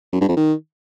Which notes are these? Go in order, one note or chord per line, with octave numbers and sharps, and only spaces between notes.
F#2
G2
F2
D#3